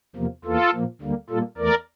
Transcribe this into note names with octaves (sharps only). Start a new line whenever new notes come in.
E2 C3 F3 A#3
E2 E3 A#3 F4 A4
A#2 F3 A#3
D2 D3 G3 A#3
A#2 G3 A#3 F4 A4
E2 E3 A3 A#4 D5